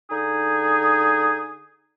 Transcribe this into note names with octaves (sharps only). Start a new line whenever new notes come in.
D3 D#4 G#4 D#6